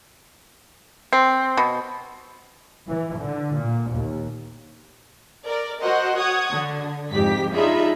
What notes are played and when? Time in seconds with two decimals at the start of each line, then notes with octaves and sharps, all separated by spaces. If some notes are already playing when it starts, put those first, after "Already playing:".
1.13 C4
1.57 B2
2.88 E3
3.19 D3
3.57 A#2
3.93 D#2
5.45 A#4 D5
5.81 F#4 A#4 C5 D#5 F#5
6.18 C#5 F#5 D#6 G#6
6.52 D3
7.12 F2 G#2 G4 B6
7.53 D4 D#4 F4 G#4 E5 B5